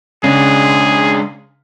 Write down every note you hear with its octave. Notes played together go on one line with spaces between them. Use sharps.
C#3 G#3 D4 G#4